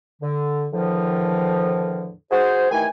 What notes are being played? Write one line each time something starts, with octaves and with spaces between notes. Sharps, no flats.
D3
E2 A2 D3 D#3 F3
F#4 G#4 C5
D#2 D#3 E3 A3 G5 G#5